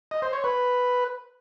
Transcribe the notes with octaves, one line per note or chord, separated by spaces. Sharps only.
D#5
C5
C#5
B4